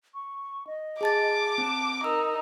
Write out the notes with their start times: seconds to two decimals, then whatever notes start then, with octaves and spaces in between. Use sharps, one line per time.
0.14 C#6
0.67 D#5
1.01 G#4 A5 D6 A6
1.58 C4 A5
2.04 D#4 A#4 E6